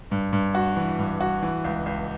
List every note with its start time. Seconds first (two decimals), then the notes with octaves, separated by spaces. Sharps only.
0.11 G2
0.33 G2
0.55 F#4
0.77 E3
0.99 G2
1.20 F#4
1.43 E3
1.64 C#2
1.86 C#2